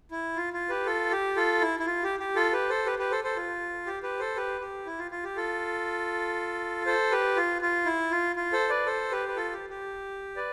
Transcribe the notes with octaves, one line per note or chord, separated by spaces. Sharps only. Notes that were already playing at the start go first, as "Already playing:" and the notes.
E4
F4
F4
G4 B4
F4 A4
G4
F4 A4
E4
E4
F4
G4
G4
F4 A4
G4 B4
A4 C5
G4 B4
G4 B4
A4 C5
A4 C5
F4
G4
G4 B4
A4 C5
G4 B4
G4
E4
F4
F4
G4
F4 A4
A4 C5
G4 B4
F4
F4
E4
F4
F4
A4 C5
B4 D5
A4 C5
G4 B4
B4
F4 A4
G4
G4
B4 D5